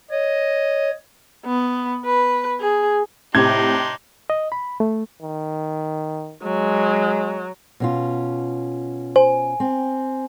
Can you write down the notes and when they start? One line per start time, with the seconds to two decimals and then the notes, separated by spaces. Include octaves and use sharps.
0.11 C#5 D#5
1.46 B3
2.05 B4
2.60 G#4
3.35 A2 C3 D4 D#4 G4 C6 G#6
4.30 D#5
4.52 B5
4.80 A3
5.22 D#3
6.43 F#3 G#3
7.80 B2 C#4 F4
9.16 C5 G#5
9.60 C4